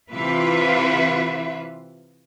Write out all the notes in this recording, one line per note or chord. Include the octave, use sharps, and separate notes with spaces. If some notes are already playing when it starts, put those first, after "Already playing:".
C3 E3 F4 B4 E5